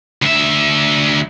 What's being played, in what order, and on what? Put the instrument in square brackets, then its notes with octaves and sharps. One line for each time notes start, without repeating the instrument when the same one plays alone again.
[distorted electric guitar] D2 E5